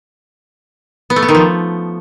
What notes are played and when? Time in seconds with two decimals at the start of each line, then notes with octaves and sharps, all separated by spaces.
1.10 B3
1.16 A3
1.22 B3
1.28 D#3
1.35 F3